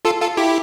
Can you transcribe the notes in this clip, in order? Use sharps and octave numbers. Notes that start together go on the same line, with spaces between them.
F4 A4
F4 A4
E4 G4